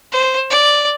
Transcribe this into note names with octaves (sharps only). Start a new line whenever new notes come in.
C5
D5